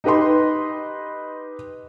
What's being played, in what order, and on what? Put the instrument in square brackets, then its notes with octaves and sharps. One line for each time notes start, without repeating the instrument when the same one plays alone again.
[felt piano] D#4 G4 B4 D#5 C6